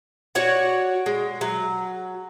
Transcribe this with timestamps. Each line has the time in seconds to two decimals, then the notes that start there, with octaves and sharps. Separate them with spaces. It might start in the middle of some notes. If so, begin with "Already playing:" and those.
0.35 F#4 C#5 D5 F#5
1.06 G#3
1.41 F#3